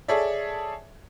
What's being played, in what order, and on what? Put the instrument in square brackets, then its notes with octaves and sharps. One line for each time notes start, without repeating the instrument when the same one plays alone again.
[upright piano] G#4 A4 C#5 D5 E5